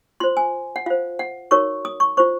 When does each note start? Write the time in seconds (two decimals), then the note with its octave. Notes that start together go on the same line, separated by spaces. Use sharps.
0.20 F4 C5 C6
0.37 G#5
0.76 F#5
0.86 F4 C5 F5
1.19 F#5
1.51 D#4 F#4 A#4 C#5 C#6
1.85 D#6
2.00 C#6
2.17 F4 C5 C#6